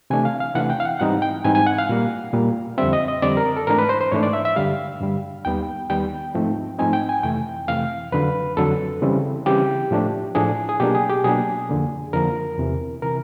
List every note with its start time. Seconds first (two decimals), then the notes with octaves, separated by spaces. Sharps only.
0.10 C3 E3 A3 D4 G#5
0.25 F5
0.40 F5
0.55 C3 E3 A3 D4 F#5
0.70 G5
0.80 F5
0.85 F#5
1.00 G#2 E3 G3 C4 D#4 F#5
1.22 G5
1.44 G#2 E3 G3 C4 D#4 G#5
1.55 G#5
1.67 F#5
1.78 F5
1.89 A#2 G3 A#3
2.33 A#2 G3 A#3
2.78 F2 D3 G3 C4 E5
2.93 D#5
3.08 D#5
3.22 F2 D3 G3 C4 D5
3.37 A#4
3.56 A4
3.67 G#2 E3 A3 D4 A#4
3.79 B4
3.89 C5
4.01 C5
4.12 G#2 E3 A3 D4 C#5
4.23 D5
4.33 E5
4.45 E5
4.56 G2 D3 G3 F5
5.01 G2 D3 G3
5.45 D#2 D#3 G3 B3 G5
5.90 D#2 D#3 G3 B3 G5
6.35 G#2 F3 A3 C4 D#4
6.79 G#2 F3 A3 C4 D#4 G#5
6.93 G5
7.09 G#5
7.23 F2 C3 E3 A3 G5
7.68 F2 C3 E3 A3 F5
8.12 F2 D3 F#3 B4
8.57 F2 D3 F#3 A4
9.02 C#3 E3 G3 C4
9.46 C#3 E3 G3 C4 G4
9.91 A2 F3 A3 D4
10.35 A2 F3 A3 D4 G#4
10.69 G#4
10.80 B2 F#3 A#3 D4 G4
10.95 G#4
11.10 G4
11.24 B2 F#3 A#3 D4 G#4
11.69 F2 D3 F3 A#3
12.13 F2 D3 F3 A#3 A#4
12.58 E2 C3 E3
13.02 C3 E3 A#4